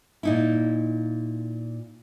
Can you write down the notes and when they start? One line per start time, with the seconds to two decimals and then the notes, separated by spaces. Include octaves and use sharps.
0.23 A#2 D#4 E4